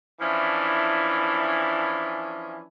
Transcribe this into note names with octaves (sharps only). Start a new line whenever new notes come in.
E3 F3 C#4 D4 E4